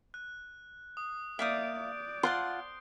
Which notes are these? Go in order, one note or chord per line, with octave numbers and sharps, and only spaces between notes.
F#6
D#6
A#3 D5 E5 F5 D#6 G6 D7
D5
F4 F#5 A5 C6